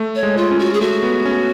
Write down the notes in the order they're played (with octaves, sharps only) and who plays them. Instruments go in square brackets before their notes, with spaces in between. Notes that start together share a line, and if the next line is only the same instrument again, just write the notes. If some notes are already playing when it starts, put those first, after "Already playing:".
Already playing: [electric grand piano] A3
[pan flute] C#5
[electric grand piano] G#3
[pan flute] F4
[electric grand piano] C#4
[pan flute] F#4
G#4
[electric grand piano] A3 [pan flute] F#4
[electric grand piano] B3
C#4